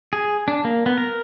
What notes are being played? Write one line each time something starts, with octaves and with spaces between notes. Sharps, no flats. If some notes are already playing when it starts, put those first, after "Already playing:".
G#4
D4
A#3
B3
A#4